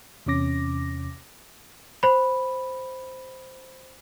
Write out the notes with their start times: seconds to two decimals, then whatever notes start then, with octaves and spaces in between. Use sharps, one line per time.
0.26 E2 C3 C#4 D6 A#6
2.03 C5 B5